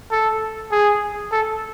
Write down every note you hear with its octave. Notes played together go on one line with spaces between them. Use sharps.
A4
G#4
A4